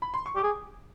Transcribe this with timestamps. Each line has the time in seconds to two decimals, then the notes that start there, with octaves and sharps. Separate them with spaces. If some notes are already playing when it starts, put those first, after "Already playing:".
0.02 B5
0.14 C6
0.26 C#6
0.36 G4
0.38 G#4 D6